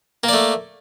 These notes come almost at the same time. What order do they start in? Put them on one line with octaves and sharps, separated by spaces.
A#3 D5 A3